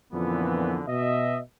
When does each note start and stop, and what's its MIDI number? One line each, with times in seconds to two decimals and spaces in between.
0.13 0.82 41
0.13 0.82 46
0.13 0.82 50
0.13 0.82 52
0.13 0.82 59
0.87 1.40 47
0.87 1.40 75
0.87 1.40 76